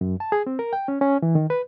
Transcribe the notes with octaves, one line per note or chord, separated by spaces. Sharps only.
F#2
A5
G#4
C4
A#4
G5
C#4
C#4
E3
D#3
B4